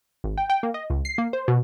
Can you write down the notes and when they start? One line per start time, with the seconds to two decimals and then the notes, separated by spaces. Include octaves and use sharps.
0.24 G#1
0.38 G5
0.50 G5
0.63 A#3
0.74 D#5
0.90 C#2
1.05 C7
1.18 A#3
1.33 C5
1.48 B2